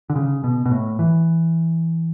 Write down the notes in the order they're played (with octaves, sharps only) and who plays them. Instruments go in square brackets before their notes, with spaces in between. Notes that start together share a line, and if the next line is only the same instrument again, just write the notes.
[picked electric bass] D3
C#3
B2
B2
A2
E3